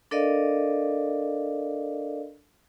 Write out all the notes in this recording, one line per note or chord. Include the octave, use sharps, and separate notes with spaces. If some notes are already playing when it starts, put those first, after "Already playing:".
D4 A4 A#4 D5 D#5 F5